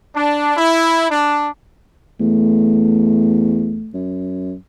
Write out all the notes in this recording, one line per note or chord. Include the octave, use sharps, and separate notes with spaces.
D4
E4
D4
E2 A3
F#2